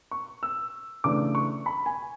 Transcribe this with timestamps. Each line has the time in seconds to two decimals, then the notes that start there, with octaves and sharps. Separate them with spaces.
0.11 C#6
0.43 E6
1.04 C#3 E3 A3 D4 D6
1.35 C#6
1.66 B5
1.86 G#5